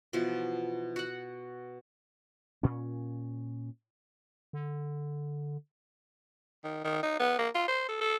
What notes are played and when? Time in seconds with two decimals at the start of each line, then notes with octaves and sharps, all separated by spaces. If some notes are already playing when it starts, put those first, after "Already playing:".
0.13 B2 E3 F3
0.96 F#4 F#5
2.63 A#2 C#4
4.53 D3
6.64 D#3
6.84 D#3
7.03 D#4
7.20 B3
7.39 A#3
7.55 F4
7.68 C5
7.89 A4
8.01 A4